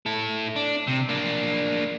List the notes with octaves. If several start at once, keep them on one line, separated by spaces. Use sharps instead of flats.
E4 A4
D4
C3
A#3 D4